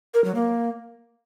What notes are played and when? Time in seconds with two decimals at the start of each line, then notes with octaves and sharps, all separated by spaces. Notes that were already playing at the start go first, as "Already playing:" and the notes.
0.14 A#4
0.24 F#3
0.35 A#3